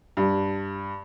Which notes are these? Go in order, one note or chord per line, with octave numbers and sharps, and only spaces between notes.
G2